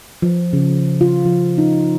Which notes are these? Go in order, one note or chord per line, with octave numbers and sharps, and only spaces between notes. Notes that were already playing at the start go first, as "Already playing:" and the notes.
F3
C#3
F4
F3
D#4